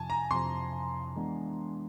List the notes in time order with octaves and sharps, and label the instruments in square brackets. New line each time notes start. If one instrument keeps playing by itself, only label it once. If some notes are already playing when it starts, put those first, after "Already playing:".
Already playing: [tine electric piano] F2 C3 F3 [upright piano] G#5 A5
[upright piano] A#5
[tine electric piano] F2 C3 F3 [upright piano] C6
[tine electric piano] E3 G#3 B3 D4